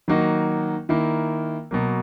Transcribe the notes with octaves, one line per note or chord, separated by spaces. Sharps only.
D#3 F#3 A#3 D#4 F#4
D#3 A#3 E4
B2 F#3 A#3